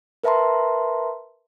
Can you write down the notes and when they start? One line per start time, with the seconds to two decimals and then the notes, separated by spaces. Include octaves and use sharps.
0.24 A#4 B4 E5 A5 A#5 C6